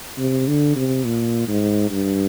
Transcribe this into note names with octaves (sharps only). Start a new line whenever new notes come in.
C3
D3
C3
A#2
G#2
G2